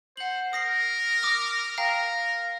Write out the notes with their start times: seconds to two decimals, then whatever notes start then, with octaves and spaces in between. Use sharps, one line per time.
0.17 C5 F#5 F#7
0.53 A#4 D#6 A#6 C7
1.23 D6 D#6 F6
1.78 A#4 F5 G5 A#5